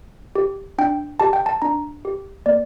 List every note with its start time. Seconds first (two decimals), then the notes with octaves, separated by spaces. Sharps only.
0.35 G4
0.78 D4 G5
1.20 G4 A5
1.33 G5
1.46 A5
1.62 D4 A#5
2.05 G4
2.46 A#3 D5